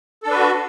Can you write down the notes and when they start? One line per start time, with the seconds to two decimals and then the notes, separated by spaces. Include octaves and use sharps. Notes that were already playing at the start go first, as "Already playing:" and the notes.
0.23 A4
0.27 D4
0.31 B4
0.35 F#4